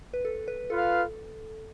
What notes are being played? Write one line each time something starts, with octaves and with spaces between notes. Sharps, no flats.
B4
A4
B4
F4 A4 B4 F5